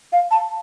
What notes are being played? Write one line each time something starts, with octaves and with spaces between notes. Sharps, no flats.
F5
A5